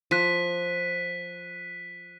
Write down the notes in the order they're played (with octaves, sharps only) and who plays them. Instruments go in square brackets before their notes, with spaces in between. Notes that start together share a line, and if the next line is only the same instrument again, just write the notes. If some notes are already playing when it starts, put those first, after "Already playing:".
[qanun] F3 [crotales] F#6 B6 D#7